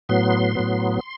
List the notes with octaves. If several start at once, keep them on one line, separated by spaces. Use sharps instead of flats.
A2 F#3 B3 C6
A2 F#3 B3